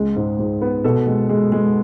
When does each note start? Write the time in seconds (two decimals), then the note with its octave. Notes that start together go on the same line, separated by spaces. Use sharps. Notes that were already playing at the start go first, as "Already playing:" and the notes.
Already playing: C#2 G#3
0.16 G#2
0.39 G#2
0.61 B3
0.84 B2 A4
1.07 G#3
1.29 G#3
1.52 G#3